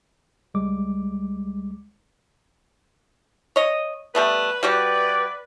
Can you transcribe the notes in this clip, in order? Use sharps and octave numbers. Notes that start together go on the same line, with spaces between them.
C#2 G3 G#3 D6
C#5 D#5
G3 A3 B3 B4
G3 F#4 G4 D5